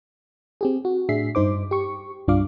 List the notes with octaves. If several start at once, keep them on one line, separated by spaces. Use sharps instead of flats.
C4 G4 G#4
F#4
A2 D4 G#4 E5 B6 C7
G2 D#4 C5 D6
G4 C#6
C2 G2 D4 F4 F5 D6